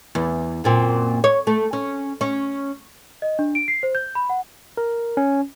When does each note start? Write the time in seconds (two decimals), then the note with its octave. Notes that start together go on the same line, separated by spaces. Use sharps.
0.15 E2
0.64 F#2 A#2 C4
1.24 C#5
1.47 A3
1.73 C#4
2.21 C#4
3.22 D#5
3.39 D4
3.55 D7
3.68 C7
3.83 C5
3.95 G6
4.15 B5
4.30 F#5
4.77 A#4
5.17 C#4